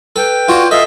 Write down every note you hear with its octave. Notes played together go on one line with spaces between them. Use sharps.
A4 B4 G5
F4 F#4 C#5 D5
F4 A4 D#5 E5